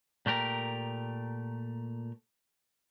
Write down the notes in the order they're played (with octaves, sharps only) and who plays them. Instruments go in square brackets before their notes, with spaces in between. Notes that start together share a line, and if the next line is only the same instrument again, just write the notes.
[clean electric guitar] A#2 A3 G4 A#4